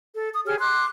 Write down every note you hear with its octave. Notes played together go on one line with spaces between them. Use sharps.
A4
D#6
G4 G#4 C#5 F6
C6 D6 F#6